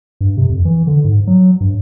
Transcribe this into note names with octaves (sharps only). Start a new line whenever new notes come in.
G2
C3
F2
E3
D3
G#2
F#3
G2